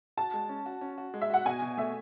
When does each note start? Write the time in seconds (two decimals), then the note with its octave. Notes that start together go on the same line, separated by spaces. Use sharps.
0.17 F#4 A5
0.34 G#3
0.49 C#4
0.66 F#4
0.81 C#4
0.98 F#4
1.14 G#3
1.21 E5
1.30 F#4 F#5
1.45 B2 G#5
1.62 B2
1.78 A3 E5